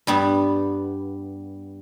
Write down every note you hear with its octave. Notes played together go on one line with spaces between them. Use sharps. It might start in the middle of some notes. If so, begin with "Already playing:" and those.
G2 G3 B3